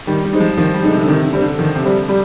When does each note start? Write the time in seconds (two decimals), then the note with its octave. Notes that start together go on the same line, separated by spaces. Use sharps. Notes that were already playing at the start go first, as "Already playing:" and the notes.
0.07 D#3 G3
0.25 G3
0.33 G#3 C4 D#4
0.40 F3
0.58 D#3 F3
0.74 G3
0.83 D3 G#3 C4 D#4
0.91 C3
1.01 D3
1.08 C3 D#3
1.25 D3
1.33 G3 C4
1.42 D3
1.59 D#3 F3
1.75 C3
1.84 G3 C4
2.09 G3